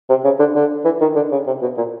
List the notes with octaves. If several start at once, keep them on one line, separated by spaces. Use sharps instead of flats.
C3
C#3
D3
D3
E3
D#3
D3
C#3
C3
B2
A#2